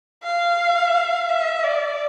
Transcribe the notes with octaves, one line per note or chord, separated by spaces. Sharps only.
F5
E5
D5